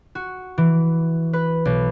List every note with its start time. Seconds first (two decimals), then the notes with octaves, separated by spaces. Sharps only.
0.15 F#4
0.58 E3
1.33 B4
1.65 B1